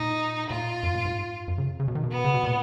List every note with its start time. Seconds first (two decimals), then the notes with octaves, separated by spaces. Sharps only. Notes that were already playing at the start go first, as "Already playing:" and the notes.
Already playing: A#2 D#4
0.50 A#2 F4
0.83 F#2
0.94 A#2
1.05 G#2
1.48 F#2
1.58 C#3
1.80 C#3
1.88 B2
1.95 D#3
2.04 B2
2.12 B3
2.25 C#3
2.34 B2
2.44 A#2